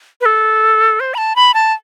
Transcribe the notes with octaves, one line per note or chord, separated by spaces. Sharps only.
B4
A4
C5
B5
A5
B5
A5